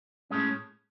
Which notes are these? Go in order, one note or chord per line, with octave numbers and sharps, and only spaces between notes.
A2 G#3 C#4